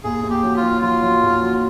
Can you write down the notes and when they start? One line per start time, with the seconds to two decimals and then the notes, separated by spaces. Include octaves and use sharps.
0.04 D#2 G#4
0.23 D#2
0.30 G4
0.43 F#3
0.56 F4
0.63 F#3
0.82 F#3 F4
1.02 F#3
1.23 D#2
1.42 F#3